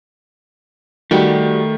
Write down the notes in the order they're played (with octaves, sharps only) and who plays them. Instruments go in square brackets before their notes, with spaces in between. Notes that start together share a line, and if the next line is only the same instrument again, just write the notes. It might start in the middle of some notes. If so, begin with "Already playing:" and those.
[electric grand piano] D#3 [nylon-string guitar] G3 F#4 G4 [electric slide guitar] A3